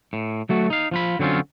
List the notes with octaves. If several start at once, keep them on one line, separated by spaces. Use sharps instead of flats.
A2
F#3 A3 F#4
D#4 F5
F3 F4 B5
D3 F#3 C4 C#4 F4